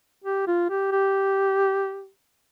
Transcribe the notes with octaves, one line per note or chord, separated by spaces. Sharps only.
G4
F4
G4
G4